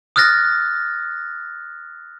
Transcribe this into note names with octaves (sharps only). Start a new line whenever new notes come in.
D#6 F6 F#6 A6 A#6